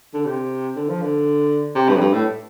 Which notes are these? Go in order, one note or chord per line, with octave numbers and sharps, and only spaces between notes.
D3
C3
D3
F3
D3
C3
G2
F2
G2
A2